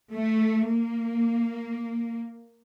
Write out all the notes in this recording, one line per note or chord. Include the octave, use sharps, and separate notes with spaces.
A3
A#3